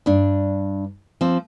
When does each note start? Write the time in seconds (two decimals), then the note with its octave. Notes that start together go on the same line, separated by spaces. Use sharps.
0.06 G2 D4
1.21 F3 C4